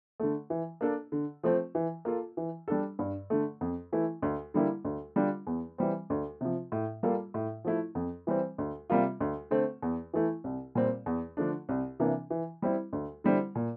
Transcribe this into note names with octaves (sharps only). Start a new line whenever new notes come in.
D3 A3
E3
A#3 D4 A4
D3
F3 A3 C4
E3
A#3 F4 A4
E3
G3 D4 A4
G2
D3 A3
F2
E3 A3 E4
D2
D3 G3 A#3 E4
D2
D3 G3 D4 F4
E2
E3 G3 C4
D2
C3 F3
A2
G3 A#3 F4 A4
A2
F3 A3 E4
F2
E3 G3 C4
D2
C3 G3 A#3 F4
D2
D3 A3 C4
E2
E3 A3 E4
C2
A#2 G3 C4
E2
D3 F3 A3 D4
C2
C3 E3 A#3 D4
E3
G3 C4 E4
D2
D3 G3 C4 E4
A#2